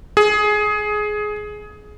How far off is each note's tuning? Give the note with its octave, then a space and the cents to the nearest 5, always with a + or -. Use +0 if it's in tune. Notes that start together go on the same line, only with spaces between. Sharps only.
G#4 +15